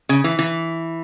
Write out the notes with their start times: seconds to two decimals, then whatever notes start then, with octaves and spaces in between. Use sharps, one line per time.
0.09 C#3
0.24 E3
0.39 E3